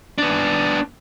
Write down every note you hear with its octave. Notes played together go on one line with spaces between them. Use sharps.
B3 D4